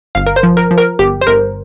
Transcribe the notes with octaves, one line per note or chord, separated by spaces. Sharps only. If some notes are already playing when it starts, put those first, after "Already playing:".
G1 F5
A#4
C5
F3
A#4
F3
A#4
G1 G4
C5
G1 A#4